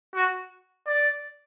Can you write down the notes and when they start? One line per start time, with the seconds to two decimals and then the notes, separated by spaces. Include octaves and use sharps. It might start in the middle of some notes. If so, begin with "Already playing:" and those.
0.15 F#4
0.87 D5